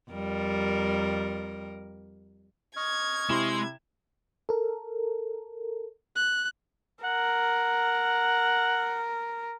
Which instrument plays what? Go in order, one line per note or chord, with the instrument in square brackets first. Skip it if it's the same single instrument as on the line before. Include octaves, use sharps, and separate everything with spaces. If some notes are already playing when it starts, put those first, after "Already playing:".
[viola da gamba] F2 G3 A#4
[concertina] D#5 C#6 F6 [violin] G#6
[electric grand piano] C3 E4 E7 [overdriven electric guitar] G#3 C6
[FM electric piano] A4 A#4
[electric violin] F#6
[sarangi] A#4 [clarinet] F#5